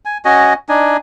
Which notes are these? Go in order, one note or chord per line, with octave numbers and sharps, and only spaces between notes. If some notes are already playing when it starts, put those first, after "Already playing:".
G#5
C#4 F#4 D#5 G#5
D4 D#4 G#5